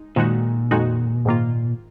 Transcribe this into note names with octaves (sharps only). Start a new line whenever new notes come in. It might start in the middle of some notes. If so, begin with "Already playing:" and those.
Already playing: G#3 D#4
F2 A#2 D#3 G#3 D#4 F#4
F2 D#3 G#3 D#4 F#4
G#2 D#3 A#3 F4